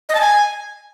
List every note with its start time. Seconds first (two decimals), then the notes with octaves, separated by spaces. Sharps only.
0.09 D#5
0.15 A5
0.21 G#5